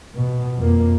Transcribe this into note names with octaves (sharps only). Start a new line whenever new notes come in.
B2
F2 A#3